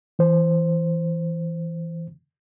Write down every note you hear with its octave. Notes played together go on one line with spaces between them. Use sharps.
E3 C5